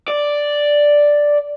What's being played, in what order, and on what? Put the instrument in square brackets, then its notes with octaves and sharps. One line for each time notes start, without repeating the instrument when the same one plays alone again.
[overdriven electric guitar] D5